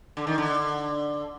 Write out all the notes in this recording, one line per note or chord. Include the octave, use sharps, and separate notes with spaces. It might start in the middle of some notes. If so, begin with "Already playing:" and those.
D3
D#3
D3